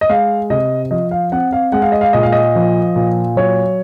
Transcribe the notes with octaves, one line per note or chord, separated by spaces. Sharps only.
D#5
G#3 F5
C3 D#5
F3 D#5
F5
C4 F#5
F5
G#3 F#5
F5
D#5
F5
A#2 D#5
F5
D#5
F3
A#2
F#3 C#5